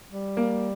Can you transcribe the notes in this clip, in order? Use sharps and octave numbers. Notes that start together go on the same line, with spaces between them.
G3
A#3